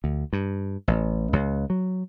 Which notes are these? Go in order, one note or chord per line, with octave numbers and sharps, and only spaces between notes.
D2
G2
A1
C#2
F#3